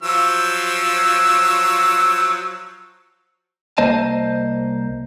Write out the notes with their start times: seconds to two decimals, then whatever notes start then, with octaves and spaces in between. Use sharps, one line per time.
0.03 F3 F#3 E6
3.78 C2 A#3 C5 D#5 A5